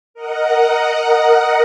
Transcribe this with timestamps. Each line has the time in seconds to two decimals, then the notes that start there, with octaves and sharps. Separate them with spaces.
0.14 A#4 D#5 F#5